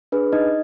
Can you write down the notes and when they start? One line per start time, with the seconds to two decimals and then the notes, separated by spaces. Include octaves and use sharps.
0.12 D4 G#4 B4
0.32 D#4 D#5